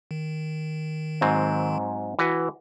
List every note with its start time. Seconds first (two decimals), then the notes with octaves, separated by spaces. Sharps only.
0.11 D#3
1.21 G#2 F#3 C4
2.19 E3 F#4 B4